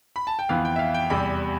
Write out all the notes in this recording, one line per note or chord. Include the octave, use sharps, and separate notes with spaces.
B5
A5
G5
F2 E3 B3 F5
G5
E5
F5
G5
E2 C3 G3 B5